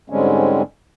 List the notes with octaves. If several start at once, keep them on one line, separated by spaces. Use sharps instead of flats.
G#2 D3 G3 G#3 C4 C#4